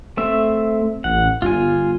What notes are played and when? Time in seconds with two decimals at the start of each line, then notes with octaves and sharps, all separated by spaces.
0.17 A3 C4 E5
1.04 A1 F#5
1.42 G1 F4 G#5